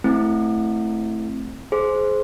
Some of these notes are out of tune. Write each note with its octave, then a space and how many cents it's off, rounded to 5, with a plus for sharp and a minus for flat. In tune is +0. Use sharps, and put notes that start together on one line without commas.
A3 +0 C4 +5 E4 +0
G#4 +25 C5 +0